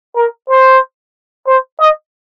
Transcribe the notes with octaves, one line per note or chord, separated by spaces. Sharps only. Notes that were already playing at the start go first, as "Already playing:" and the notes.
A#4
C5
C5
D#5